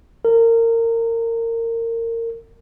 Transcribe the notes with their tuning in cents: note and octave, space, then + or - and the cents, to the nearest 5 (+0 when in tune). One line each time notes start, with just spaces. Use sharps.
A#4 -25